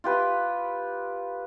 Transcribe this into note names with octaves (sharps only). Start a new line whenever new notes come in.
F4 G4 B4